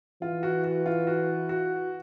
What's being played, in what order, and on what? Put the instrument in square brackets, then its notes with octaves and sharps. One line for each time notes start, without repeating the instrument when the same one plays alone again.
[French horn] E3 [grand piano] F4
[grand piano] F#4
F#4
F4
F#4
F#4